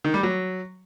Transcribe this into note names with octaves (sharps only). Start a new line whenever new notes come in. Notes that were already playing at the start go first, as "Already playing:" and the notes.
D#3
G3
F#3